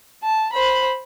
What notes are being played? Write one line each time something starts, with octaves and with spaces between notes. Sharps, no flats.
A5
C5 B5